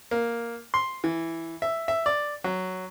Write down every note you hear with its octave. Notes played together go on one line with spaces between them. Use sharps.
A#3
C6
E3
E5
E5
D5
F#3